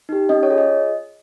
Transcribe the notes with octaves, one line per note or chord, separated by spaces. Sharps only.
D#4 G4
C#4 D#5
C#5
F4 G#4
D#5